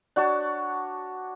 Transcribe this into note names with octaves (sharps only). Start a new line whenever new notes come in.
D4 F#4 C#5 A5